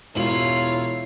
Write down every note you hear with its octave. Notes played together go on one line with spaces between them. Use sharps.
E1 E4 F4 C#5 F#7